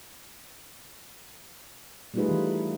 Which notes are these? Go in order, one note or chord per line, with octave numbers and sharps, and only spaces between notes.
G3 A3 D#4 F4 G#4 B4
E3